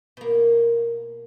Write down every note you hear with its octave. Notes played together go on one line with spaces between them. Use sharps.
B2 A#3